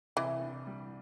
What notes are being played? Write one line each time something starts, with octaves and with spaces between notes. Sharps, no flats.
C2 E3
D4
G3